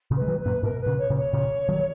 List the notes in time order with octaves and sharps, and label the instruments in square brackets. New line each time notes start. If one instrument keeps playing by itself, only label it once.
[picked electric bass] A#2 C#3
[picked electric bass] G#3 [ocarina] B4
[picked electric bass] D#3 F#3
[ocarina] B4
[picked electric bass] F#2 A#2
[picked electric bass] G#2 B2 [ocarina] A#4
[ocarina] B4
[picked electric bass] A#2 C#3
[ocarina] C#5
[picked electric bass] A#2 C#3
[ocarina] C#5
[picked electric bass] A#2 C#3
D#3 F#3